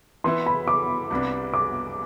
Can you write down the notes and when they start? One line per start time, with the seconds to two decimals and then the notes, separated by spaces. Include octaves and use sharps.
0.24 E3 B3 E4 C6
0.46 B5
0.68 D6
1.10 C2 C3 G3 B3 D4
1.53 D6